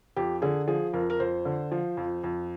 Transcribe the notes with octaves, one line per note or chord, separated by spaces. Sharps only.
F2 G4
D3 G#4
F3 G#4
F2 A#4
A#4
F2 C5
D3
F3
F2
F2